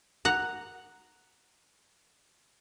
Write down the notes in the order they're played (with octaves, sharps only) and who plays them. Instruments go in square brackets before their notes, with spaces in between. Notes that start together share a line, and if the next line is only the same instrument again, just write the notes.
[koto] F#5 A#5